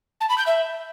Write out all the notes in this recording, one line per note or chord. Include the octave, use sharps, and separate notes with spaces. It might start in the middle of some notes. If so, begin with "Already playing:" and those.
A5
B5
G6
E5